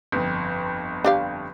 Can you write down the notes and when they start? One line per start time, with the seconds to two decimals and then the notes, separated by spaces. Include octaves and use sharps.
0.12 G1 F2
1.04 D4 G4 F5